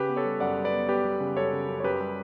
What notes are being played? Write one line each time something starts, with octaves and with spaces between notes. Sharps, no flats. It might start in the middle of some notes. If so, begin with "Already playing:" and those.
Already playing: C#3 G4 B4
B3
A4 C#5
G3
F#2 D5 F#5
G3
B4 D5
B3
B3 G4 B4
G3
C#3
F#2 A4 C#5
C#3
F#2
C#5
F#2 G4 B4
G3